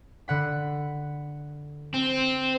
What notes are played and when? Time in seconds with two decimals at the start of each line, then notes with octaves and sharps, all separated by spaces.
0.28 D3 F#5 B5
1.94 C4